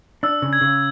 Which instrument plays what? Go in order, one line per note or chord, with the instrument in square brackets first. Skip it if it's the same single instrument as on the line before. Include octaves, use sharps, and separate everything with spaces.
[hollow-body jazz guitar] D4 [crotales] E6
[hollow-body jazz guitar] C#3
[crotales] G#6
[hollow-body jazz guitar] C#3